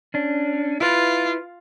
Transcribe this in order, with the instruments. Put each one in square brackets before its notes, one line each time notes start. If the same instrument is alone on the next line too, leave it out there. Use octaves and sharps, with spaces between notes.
[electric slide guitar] C#4 D4
[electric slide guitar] E4 B4 [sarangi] F4